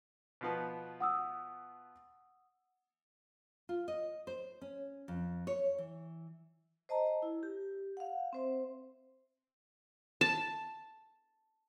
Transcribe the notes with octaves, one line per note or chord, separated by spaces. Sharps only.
B2 F3 B3
F#5 D#6 E6
F4
D#5
C5
C#4
F2
C#5
E3
C5 D#5 A5 A#5
E4
G4
F5 F#5
C4 C5 E5
A5